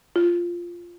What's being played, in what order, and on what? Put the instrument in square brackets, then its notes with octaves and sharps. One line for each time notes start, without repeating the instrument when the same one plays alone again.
[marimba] F4